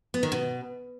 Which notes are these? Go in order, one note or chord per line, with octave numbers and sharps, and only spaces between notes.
B3
D#3
B2